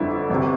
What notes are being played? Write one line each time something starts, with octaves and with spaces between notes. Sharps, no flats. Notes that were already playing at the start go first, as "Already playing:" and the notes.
Already playing: G1 F2 D3 G3 E4
G1 C3